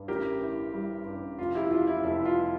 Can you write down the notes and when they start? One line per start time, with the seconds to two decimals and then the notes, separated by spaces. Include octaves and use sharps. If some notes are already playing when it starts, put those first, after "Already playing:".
Already playing: G2
0.08 A1 G4 A#4
0.41 E3
0.73 G3
1.06 G2
1.38 F1 F4
1.55 E4 G4
1.71 E3 F4
1.87 E4
2.04 F1 E4
2.25 F4